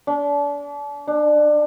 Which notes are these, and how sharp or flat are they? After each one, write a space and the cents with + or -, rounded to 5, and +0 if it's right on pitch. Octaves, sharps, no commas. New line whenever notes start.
D4 -35
D4 +25